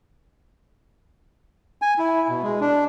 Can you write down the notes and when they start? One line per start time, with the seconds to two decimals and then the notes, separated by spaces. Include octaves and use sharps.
1.82 G#5
1.99 E4
2.29 B2
2.43 G#3
2.61 D4